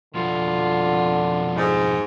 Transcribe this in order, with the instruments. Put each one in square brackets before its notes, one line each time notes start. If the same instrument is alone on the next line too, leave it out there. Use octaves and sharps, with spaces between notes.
[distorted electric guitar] F2 B2 [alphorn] D3 [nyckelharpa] F4
[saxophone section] G#2